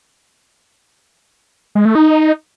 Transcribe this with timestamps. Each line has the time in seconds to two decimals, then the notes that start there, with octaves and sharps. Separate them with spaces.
1.75 G#3
1.85 A3
1.95 D#4